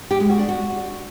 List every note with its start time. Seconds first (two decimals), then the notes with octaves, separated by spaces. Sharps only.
0.11 G4
0.20 G#3
0.30 F#4
0.39 D4
0.49 F#4